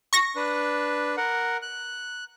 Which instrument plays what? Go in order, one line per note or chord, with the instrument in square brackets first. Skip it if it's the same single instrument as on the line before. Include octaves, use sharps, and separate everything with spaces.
[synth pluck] C#6 A#6
[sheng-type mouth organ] D4 B4
A#4 F#5
F#6